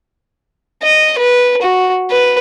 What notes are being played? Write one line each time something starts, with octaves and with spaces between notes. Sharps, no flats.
D#5
B4
F#4
B4